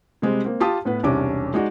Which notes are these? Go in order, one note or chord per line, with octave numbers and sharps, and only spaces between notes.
C3 G3 G#3 C4
A#3 C4
F4 G4 A5 D#6
A2 B3 B4
E1 C2 C3 C#4 D4 D6
G#3 D#4 F#4 D5